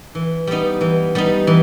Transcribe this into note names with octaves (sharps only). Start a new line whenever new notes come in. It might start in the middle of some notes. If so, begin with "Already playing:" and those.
E3
G3 B3 D#4
E3
G3 B3 D#4
E3